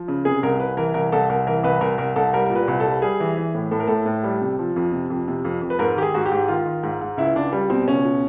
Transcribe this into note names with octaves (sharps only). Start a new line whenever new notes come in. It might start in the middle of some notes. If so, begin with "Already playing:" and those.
Already playing: F3
C#3
C3 G#4
C2 A#4
C2 B4
E3 A#4
C2 A#4
C2 A4
C2 A#4
E3 A#4
C2 B4
C2 A#4
C2 A#4
C2 A4
G3 A#4
A#2 A#4
B4
C2
A4
G3
G3 G#4
E3
E3
A2
A2 A4
A#4
A2 A4
A2
G3
C3
F3
F2
C3
F2
C3
F2
F2
B4
G#2 A#4
D#3 G4
G#4
G#2 F#4
G4
G#2
D#3 F4
D#3
G#2
G#2
C#2 E4
C#2 D4
G3
B2 C4
C#2 C#4
B2